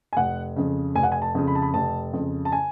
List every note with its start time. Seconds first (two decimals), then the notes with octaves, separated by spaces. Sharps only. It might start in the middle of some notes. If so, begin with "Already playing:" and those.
0.13 G#5
0.17 F1 F#5
0.56 F2 C#3
0.95 F1 G#5
1.03 F#5
1.12 G#5
1.22 A5
1.35 F2 C#3
1.47 B5
1.55 A5
1.62 B5
1.74 F1 A5
2.13 F2 C#3
2.45 A5
2.52 G#5